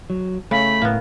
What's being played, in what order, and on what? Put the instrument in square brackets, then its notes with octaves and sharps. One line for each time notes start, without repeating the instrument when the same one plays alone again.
[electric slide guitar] F#3
[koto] C#3 [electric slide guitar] A3 [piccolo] B5
[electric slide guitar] A2 [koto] A#3 B3